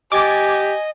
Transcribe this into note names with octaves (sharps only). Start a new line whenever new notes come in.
G4 D#5 G#5 D6 G#6 A6